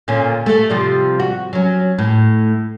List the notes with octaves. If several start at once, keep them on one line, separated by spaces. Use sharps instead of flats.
A#2 D3 C#4
A3 A4
C3 F3 G3
F#4
F#3 C#4
A2